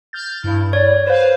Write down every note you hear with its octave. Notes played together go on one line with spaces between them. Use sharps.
F6 G6 A6
G2 E4
C#5 D5
B4 C5 F5